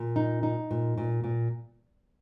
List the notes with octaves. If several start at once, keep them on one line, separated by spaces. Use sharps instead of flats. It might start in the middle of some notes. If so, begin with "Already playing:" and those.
Already playing: A#2
D#4
D#4
A#2
A#2
A#2